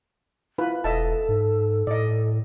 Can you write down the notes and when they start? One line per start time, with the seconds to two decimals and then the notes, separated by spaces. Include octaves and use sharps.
0.58 E4 F4 B4
0.84 E1 A4 D#5 E5 A5
1.29 G#2
1.87 A2 D5 D#5